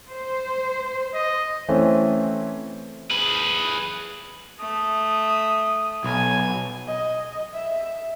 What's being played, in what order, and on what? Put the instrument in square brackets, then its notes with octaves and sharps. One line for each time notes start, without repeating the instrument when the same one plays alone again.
[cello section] C5
[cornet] D#5
[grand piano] E3 A3 C4 C#4
[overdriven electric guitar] G#4 B4
[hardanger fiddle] A3 [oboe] D#6
[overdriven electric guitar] B1 [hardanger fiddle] G#5
[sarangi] D#5
E5